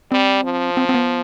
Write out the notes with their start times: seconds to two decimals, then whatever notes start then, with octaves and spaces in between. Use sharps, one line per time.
0.12 G3 C4
0.44 F3
0.77 C4
0.89 C4
0.94 B3